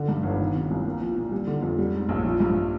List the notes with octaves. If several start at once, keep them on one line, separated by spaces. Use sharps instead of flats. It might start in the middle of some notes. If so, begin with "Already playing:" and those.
Already playing: D3
G2
G1
D#3
C3
C2
A#3
F3
A#2
G3
D3
F2
G3
G#2
A#1
F3
G2